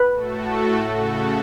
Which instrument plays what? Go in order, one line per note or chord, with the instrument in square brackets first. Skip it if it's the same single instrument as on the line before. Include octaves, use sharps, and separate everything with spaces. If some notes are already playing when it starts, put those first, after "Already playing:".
Already playing: [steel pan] B4
[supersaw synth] A2 A3 F#4 A4
C#3 A3 F#4 A4